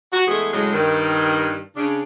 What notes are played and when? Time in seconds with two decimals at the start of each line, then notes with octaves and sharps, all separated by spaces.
0.12 F#4
0.26 E3 G#3 A3 B3 G#4
0.51 A2 C#3 F#3 G#3
0.73 G2 D#3
1.76 C#3 D4